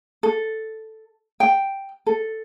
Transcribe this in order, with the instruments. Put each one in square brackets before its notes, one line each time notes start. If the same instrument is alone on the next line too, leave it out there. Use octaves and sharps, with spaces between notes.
[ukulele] A4
G5
A4